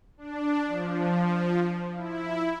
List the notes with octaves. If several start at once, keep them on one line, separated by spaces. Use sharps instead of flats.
D4
F3
E4